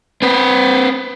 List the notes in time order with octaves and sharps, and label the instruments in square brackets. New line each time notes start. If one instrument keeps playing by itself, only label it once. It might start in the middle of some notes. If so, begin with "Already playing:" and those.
[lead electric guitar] C4 B4